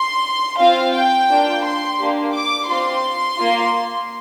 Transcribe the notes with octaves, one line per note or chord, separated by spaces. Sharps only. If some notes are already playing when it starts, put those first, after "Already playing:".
Already playing: C6
C4 F4 F5
G5
A#3 D4 F4
C6
A#3 D4 G4
D6
C4 F4 C6
A#3 F4